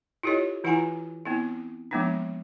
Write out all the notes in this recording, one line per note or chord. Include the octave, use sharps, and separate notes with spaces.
E4 F4 G4 A4 C#5 D#5
E3 E4 F4 F#5 G#5 A#5
B3 C4 E4
F3 G#3 A#3 B3 D4 D#4